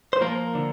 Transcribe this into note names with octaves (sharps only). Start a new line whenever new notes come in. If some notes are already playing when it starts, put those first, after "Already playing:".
C5
F3 A#3 A#4
D3